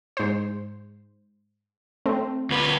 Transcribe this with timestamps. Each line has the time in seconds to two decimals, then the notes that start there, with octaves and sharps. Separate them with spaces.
0.17 G#2 C5
2.06 A3 C4
2.50 D2 B4